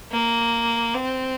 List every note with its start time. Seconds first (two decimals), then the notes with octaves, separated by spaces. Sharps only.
0.12 A#3
0.94 C4